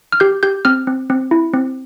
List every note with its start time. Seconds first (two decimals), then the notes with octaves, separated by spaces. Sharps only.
0.12 F6
0.20 G4 G6
0.43 G4 G6
0.65 C4 F6
0.87 C4
1.10 C4
1.31 E4
1.54 C4